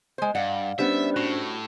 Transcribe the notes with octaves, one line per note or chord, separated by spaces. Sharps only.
G#3 C5
G2 D5 F5 F#5
G3 B3 C#4 D4 C5 E5
A2 F#4